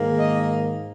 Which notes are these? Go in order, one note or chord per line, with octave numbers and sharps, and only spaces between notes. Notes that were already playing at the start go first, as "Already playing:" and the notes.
Already playing: G#2 D#3 A#3
D#5